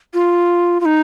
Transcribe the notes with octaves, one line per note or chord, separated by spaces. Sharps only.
F4
F4
D#4